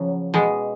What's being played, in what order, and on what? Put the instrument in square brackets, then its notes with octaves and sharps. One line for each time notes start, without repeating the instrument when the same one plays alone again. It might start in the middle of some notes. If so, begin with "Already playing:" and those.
Already playing: [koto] C#3 F3 F#3
B2 G#3